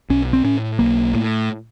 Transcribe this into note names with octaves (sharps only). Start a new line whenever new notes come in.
B1 C#4
C4
A2 C#4
B1 A#3
A2